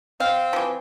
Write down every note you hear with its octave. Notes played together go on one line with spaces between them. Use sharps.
C4 F5
E3 F3